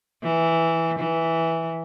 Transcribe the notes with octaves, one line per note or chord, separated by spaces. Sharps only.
E3
E3